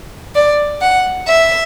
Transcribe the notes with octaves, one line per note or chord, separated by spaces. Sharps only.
D5
F#5
E5